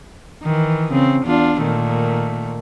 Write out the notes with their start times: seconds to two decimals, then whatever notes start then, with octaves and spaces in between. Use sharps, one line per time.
0.43 D#3 E3
0.92 C#3 C4
1.25 E2 D4 F4
1.62 A#2 D#3 A3